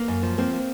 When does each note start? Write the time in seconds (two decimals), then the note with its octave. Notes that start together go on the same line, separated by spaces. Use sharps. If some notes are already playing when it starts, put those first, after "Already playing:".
Already playing: A#3
0.08 F#2
0.23 F3
0.38 A#3 C4
0.53 A#3